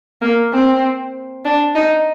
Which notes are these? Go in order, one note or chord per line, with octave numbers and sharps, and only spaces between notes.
A#3
C4
D4
D#4